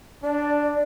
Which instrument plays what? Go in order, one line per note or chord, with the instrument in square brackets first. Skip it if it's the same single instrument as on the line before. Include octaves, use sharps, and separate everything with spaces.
[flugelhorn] D4 [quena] D5